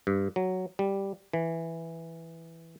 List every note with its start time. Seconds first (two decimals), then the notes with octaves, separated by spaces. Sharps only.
0.07 G2
0.36 F#3
0.79 G3
1.33 E3